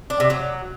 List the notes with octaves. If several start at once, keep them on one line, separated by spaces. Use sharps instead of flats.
D4
C3
F#3